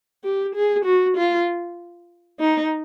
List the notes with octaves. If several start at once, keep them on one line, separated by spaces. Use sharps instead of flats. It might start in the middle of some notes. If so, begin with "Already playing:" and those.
G4
G#4
F#4
F4
D#4